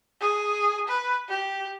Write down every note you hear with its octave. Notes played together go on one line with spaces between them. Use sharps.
G#4
B4
G4